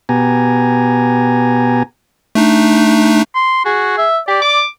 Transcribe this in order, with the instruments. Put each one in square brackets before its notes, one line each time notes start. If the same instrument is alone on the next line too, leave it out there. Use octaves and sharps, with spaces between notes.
[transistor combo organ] B2 B3 G4 G#5 A#5
[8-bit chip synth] A3 D4 D#4
[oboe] C6
[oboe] F#4 [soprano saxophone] G#4
[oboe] E5
[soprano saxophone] G4 [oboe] D5
[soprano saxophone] D6